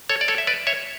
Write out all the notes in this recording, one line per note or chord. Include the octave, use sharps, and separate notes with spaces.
A4 C#5
D5
A4 C#5
E5
B4 D5
C#5 E5